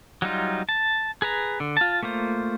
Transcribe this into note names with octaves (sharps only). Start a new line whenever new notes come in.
F#3 G3 D#4 F4
A5
G#4 B4 A#5
D3
F4 A5
A3 A#3 F4 C5